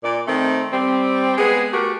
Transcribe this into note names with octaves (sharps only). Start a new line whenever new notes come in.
A#2 D5
D#3 A3 C4
G3 C4
G#3 B3 G#4
A3 F#4 G4 A#4